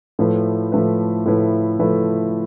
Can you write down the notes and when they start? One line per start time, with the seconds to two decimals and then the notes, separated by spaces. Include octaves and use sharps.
0.19 A2 F3 A3 E4 B4
0.72 A2 F3 A3 E4 B4
1.26 A2 F3 A3 E4 B4
1.79 A2 F3 A3 E4 B4